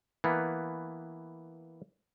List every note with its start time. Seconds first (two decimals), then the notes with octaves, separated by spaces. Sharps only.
0.24 E3 A#3 B3